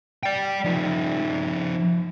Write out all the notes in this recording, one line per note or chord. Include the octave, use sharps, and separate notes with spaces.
D5 G5
F3 D#4